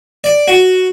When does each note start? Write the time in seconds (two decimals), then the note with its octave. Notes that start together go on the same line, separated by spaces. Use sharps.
0.24 D5
0.48 F#4